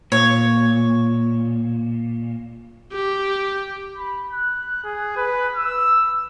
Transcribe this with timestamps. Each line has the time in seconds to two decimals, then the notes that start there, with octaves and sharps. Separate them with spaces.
0.12 A#2 C#5
2.93 G4
3.98 B5
4.31 F#6
4.84 G#4
5.17 B4
5.56 E6